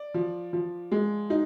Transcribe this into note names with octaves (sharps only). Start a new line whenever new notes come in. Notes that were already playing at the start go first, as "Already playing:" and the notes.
Already playing: D5
F3
F3
G#3
D#4